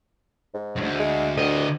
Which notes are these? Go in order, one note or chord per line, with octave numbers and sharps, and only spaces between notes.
G#2
D2 G2
G#3
D2 D3 D#5